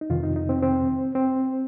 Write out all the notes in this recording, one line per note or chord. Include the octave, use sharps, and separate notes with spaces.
D#4
F2 C3 D#3 F4
D#4
D#4
C4
C4
C4